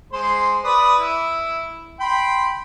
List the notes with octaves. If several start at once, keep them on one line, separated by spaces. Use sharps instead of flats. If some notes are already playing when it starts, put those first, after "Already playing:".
G#3 C5 C6
B4 D5 D#6
E4
G5 B5 C6